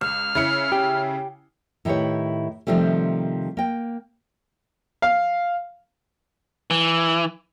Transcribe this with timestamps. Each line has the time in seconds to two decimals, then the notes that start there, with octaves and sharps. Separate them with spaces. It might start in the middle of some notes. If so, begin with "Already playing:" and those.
0.01 C#2 F6
0.35 C#3 E4 C#7
0.72 G4
1.85 A2 D#3 E4 G4 B4 C#5
2.67 C3 D#3 F3 G3 A3
3.57 A#3 G5
5.02 F5
6.70 E3